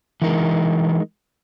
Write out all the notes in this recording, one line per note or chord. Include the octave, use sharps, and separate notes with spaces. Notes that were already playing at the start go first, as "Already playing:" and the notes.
E3 G#3 D#4 A#4